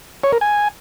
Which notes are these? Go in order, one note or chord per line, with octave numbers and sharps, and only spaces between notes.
C#5
A#4
G#5